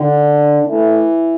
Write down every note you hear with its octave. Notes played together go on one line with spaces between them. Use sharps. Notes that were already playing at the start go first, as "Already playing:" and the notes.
Already playing: D3
D4
E3 A3